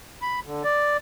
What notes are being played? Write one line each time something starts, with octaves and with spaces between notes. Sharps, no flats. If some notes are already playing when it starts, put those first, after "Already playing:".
B5
D3
D5